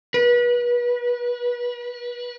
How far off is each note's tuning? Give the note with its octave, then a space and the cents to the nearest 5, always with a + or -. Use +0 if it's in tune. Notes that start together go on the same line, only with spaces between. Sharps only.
B4 -30